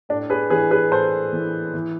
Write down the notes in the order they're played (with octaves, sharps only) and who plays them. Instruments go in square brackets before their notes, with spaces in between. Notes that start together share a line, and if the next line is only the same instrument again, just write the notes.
[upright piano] A2 D4
G#4 B4
E3 G#4 B4
G#4 B4
A2 A4 C5
E3
E3